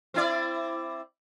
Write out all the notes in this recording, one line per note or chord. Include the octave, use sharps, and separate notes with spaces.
C4 E4 D5